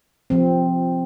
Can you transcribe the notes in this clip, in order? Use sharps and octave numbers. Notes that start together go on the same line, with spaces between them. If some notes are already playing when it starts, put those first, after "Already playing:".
F3 C4